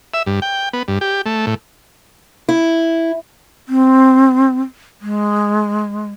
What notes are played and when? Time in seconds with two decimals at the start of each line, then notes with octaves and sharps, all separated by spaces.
0.14 E5
0.26 G2
0.42 G5
0.73 B3
0.88 G2
1.01 G4
1.26 A3
1.47 A2
2.49 E4
3.69 C4
5.02 G#3